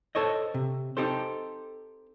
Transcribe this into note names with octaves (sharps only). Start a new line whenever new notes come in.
A4 C5 C#5 D#5
C3
C4 D#4 G4 A4 C5